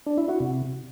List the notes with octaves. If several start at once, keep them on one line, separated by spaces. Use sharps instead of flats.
D4
E4
F#4
C3